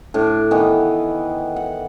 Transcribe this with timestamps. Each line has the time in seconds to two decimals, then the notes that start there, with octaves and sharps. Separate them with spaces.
0.14 A2 D4
0.51 D#3 E3 B3
1.56 F#5